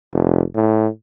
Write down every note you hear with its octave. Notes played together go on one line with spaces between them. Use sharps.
F1
A2